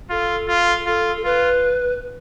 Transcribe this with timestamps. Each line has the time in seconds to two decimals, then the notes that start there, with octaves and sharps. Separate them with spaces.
0.10 F4 A4
0.48 F4
0.86 F4 A4
1.16 A4
1.25 F4 B4